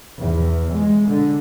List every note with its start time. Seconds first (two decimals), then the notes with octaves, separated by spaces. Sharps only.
0.20 E2
0.73 G#3
1.08 D3